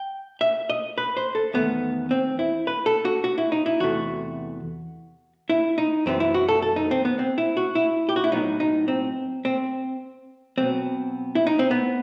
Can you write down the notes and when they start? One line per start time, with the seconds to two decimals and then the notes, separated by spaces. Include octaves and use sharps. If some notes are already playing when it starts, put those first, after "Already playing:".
Already playing: G5
0.41 E5
0.70 D#5
0.98 B4
1.17 C5
1.35 A4
1.54 E2 D#3 A3 B3
2.11 C4
2.39 E4
2.67 B4
2.86 A4
3.05 F#4
3.24 F#4
3.38 E4
3.52 D#4
3.66 E4
3.80 E2 C3 E3 A3 F#4
5.50 E4
5.78 D#4
6.06 F#2 E3 G3 B3 C4
6.20 E4
6.34 F#4
6.49 A4
6.62 A4
6.76 D#4
6.91 C4
7.05 B3
7.19 C4
7.38 E4
7.57 F#4
7.75 E4
8.09 G4
8.16 F#4
8.24 E4
8.31 A2 F#3 B3 D#4
8.60 D#4
8.88 C4
9.45 C4
10.58 B2 F#3 B3 C4
11.35 E4
11.47 D#4
11.59 C4
11.71 B3